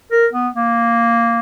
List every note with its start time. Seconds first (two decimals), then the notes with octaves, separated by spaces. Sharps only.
0.11 A#4
0.33 B3
0.55 A#3